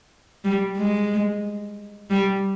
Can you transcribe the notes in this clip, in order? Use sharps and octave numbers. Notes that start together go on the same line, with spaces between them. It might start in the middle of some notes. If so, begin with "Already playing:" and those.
G3
G#3
G3